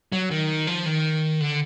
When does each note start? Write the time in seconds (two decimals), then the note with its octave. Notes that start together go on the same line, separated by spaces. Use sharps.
0.12 F#3
0.31 D#3
0.67 F3
0.86 D#3
1.41 D3